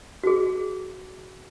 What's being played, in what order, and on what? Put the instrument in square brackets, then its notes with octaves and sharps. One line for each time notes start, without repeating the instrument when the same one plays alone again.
[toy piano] F#4 G#4